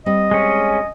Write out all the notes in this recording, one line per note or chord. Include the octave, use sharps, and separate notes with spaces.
G3 C4 D#5
G#3 C#4